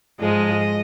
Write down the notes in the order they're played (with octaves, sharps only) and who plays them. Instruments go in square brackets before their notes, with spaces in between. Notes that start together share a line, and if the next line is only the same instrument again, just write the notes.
[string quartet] G#2 F3 G#3 D#5